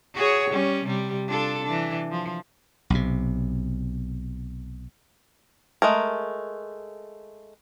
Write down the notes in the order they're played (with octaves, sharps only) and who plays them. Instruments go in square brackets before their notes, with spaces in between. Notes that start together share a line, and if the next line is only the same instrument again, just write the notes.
[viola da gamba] F#4 G#4 C#5
G3 C#4
C3 G3
D4 F4 A4
E3 D4
F3
[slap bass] B1 C3
[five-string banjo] G#3 A3 A#4